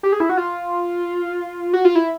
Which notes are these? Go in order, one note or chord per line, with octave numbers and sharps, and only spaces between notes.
G4
G#4
E4
F#4
F4
F#4
F4
E4